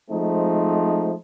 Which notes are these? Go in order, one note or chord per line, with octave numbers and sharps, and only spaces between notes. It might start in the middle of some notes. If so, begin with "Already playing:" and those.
F3 G#3 A3 C4 D#4